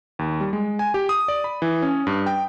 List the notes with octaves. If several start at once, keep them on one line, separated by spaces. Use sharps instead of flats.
D#2
G3
G#3
G#5
G4
D#6
D5
B5
E3
C#4
G2
G5